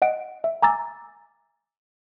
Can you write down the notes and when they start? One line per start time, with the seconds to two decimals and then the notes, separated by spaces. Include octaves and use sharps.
0.02 D#5 F#5 D7
0.44 E5
0.62 G#5 A#5 D6 E6 A6